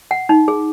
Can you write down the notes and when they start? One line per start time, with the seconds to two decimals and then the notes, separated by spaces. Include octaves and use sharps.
0.11 F#5
0.29 D#4
0.48 G#4